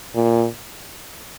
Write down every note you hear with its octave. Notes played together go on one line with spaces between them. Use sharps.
A#2